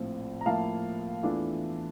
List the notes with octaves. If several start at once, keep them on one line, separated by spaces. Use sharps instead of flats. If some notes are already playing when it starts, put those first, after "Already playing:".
Already playing: A#1 A2 F3 C4 F4
A#5
A2 F3 A#3 E4 F5 A5
E2 E3 A3 D4 F4